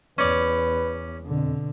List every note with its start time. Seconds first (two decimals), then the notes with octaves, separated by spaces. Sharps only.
0.18 E2 C#4 B4 D5
1.26 F2 B2 D3